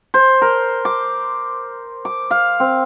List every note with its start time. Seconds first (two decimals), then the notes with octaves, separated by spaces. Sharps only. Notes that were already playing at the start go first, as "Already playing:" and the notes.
0.14 C5
0.42 A#4
0.85 D6
2.05 D6
2.31 F5
2.60 C4